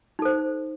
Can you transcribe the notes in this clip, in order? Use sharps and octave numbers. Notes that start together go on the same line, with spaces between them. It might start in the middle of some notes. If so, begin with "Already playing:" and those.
D#4 A4 C5